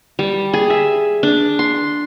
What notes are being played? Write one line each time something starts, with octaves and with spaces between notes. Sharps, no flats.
G3
G#4
E5
D4
C6